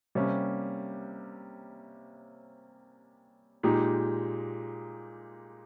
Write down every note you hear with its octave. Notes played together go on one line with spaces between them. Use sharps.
C3 G3 A#3 C#4
A#2 G#3 D#4 G4